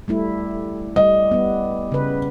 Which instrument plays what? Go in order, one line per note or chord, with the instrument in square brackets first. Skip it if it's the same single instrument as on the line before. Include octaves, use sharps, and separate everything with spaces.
[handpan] G3 A3 E4
[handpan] G3 [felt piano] D#5
[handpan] G3 B3
C#3 B4